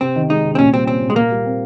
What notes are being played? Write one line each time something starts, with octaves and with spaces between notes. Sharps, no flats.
C3 C4
D#3
G#3 D#4
C3
C4
A#2 C#4
G3 C4
C4 C#4
A#2
G#3
A#2 A#3
G3
C4